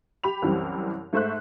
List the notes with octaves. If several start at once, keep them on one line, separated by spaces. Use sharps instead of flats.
G4 B5 F7
C2 F#2 E3 G3 C4
G#2 A3 C5 E5 C#6 F#6